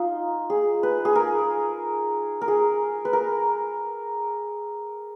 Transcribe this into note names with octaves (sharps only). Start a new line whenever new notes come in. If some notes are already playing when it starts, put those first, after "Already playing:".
Already playing: D#4 F4
G#4
B4
G#4
A#4
A#4
G#4
B4
A#4